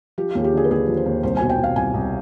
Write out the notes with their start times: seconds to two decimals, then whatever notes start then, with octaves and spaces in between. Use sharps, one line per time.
0.18 F3 G4
0.31 F4
0.35 D#2 G#4
0.44 G4
0.53 D3 G#4
0.64 B4
0.71 D#2 G#4
0.88 F3
0.97 C5
1.06 D#2
1.23 C2 C5
1.37 G#5
1.41 B2
1.49 G5
1.58 B2
1.63 F5
1.76 C2 G#5
1.94 C2